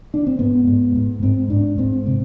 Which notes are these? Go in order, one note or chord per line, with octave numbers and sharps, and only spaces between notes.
D4
C4
G#2 B3
G#2
G#2
G#2 C4
G#2 D4
G#2 C4
C3 C4